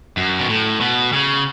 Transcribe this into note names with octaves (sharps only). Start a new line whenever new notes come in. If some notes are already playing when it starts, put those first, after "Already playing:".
F#2
B2
A2
B2
C#3